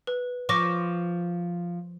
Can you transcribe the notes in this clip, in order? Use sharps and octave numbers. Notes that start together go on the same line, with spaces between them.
B4
F3 C#6 D6 A#6